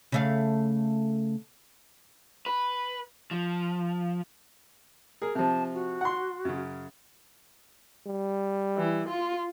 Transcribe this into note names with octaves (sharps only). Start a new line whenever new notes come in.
C#3 A3 F5
B4
F3
G#4 A#4
C3 F3 A5
F#4
F#5 C6
F#2 C#3
G3
E3
F4